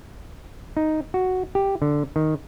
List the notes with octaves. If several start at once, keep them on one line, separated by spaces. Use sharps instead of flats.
D#4
F#4
G4
D3
D#3